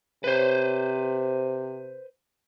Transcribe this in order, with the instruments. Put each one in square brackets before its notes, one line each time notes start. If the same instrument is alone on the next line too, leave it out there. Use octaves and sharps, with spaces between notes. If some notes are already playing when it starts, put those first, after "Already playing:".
[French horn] C3 [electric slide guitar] B4 C5